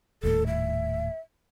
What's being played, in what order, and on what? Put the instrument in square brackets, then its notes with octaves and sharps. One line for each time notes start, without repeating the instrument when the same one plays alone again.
[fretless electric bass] D#1 D#2 A2 [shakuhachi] A4
[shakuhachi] E5